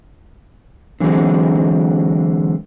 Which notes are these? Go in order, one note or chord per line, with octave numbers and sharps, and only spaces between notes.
D3 E3 F#3 G#3 C4